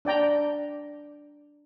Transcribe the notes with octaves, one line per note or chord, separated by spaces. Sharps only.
D4 D5 G5 A#5